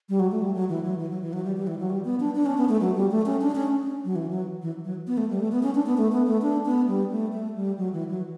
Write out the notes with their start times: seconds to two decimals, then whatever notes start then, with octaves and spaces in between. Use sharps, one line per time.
0.09 G3
0.20 F#3
0.31 A3
0.42 G3
0.54 F#3
0.69 E3
0.84 F#3
0.99 E3
1.11 F#3
1.22 E3
1.33 F#3
1.45 G3
1.56 G3
1.67 E3
1.79 F#3
1.90 G3
2.05 B3
2.20 D4
2.35 D4
2.46 C#4
2.58 B3
2.69 A3
2.81 F#3
2.96 G3
3.11 A3
3.26 C#4
3.41 D4
3.55 C#4
3.83 C#4
4.05 F#3
4.16 E3
4.31 F#3
4.62 E3
4.85 F#3
5.07 B3
5.17 A3
5.30 G3
5.40 A3
5.52 B3
5.63 C#4
5.75 D4
5.86 B3
5.97 A3
6.12 B3
6.27 A3
6.42 D4
6.66 B3
6.88 G3
7.11 A3
7.33 A3
7.56 G3
7.78 F#3
7.93 E3
8.09 F#3